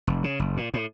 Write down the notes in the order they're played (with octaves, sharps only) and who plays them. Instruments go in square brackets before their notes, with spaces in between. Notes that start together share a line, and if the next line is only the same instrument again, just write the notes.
[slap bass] F1
C#3
F#1
A#2
A2